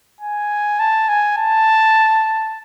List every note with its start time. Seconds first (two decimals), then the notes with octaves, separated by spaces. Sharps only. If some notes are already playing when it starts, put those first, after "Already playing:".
0.20 G#5
0.79 A5
1.08 G#5
1.37 A5